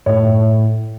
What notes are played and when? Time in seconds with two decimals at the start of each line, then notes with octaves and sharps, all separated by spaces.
0.06 A2 C#5
0.24 A2